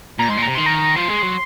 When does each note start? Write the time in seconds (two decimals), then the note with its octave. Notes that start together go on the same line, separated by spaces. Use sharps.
0.19 A#2 A#5
0.29 G#2 C6
0.38 A#2
0.42 A#5
0.48 C3
0.55 D#3 C6
0.66 A#5
0.96 F3 C6
1.09 G#3
1.22 F#3